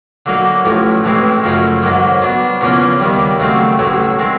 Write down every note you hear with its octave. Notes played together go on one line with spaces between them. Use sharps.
D3 F#3 A#3 D#4
A1 A2 F3
A1 A2 E3 G#3 C4
F#2 C#3 F3 A3 C#4
G#2 D#3 F#3 A#3
F#3 B3 D4
E2 C#3 F3 A#3 C#4
D#2 D#3 G3
D#2 C#3 F#3 A3 C4
A1 A2 F#3 A3
D#3 G#3 C4